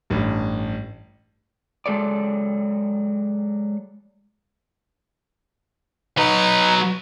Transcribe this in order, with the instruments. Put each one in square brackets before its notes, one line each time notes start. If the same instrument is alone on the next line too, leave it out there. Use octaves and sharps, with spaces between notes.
[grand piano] A1 G2
[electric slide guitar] F#3 G#3 A4 C#5 D5
[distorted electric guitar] F#3 B4 [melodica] D#4